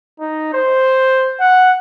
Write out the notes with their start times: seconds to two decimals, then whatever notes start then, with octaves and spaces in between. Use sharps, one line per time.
0.20 D#4
0.54 C5
1.40 F#5